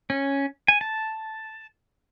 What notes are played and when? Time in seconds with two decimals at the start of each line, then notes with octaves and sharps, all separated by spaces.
0.10 C#4
0.68 G#5
0.81 A5